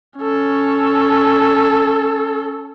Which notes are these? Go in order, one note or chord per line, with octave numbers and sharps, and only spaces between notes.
C#4 A4